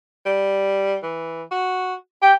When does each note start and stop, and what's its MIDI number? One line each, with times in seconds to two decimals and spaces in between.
0.26 0.97 55
1.03 1.43 52
1.51 1.94 66
2.22 2.32 67
2.22 2.34 79